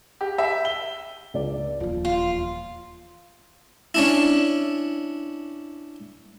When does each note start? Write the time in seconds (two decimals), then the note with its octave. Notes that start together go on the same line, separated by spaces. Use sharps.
0.21 G4
0.38 E5
0.65 G7
1.34 C#2 D5
1.80 D#1 E2 F3
2.05 F4
3.94 C#4 D4 E4